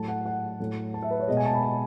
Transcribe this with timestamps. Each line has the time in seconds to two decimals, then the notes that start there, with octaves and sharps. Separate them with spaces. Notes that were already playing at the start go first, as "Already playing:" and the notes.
Already playing: A2 F#3 A3 A5
0.08 F#5
0.26 F#5
0.60 A2 F#3 A3
0.94 A5
1.03 E5
1.11 B4
1.20 C#5
1.28 B2 G#3 D#5
1.37 G#5
1.46 A5
1.53 B5
1.62 A5